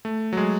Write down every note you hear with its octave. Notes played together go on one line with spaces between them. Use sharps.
A3
F#3
G#3